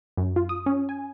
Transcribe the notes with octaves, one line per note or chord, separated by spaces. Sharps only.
F#2
F4
D#6
C#4
G#5